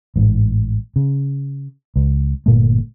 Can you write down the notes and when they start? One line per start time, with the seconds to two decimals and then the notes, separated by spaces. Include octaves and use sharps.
0.16 A1 G#2
0.96 C#3
1.96 C#2
2.46 G1 A#2 A3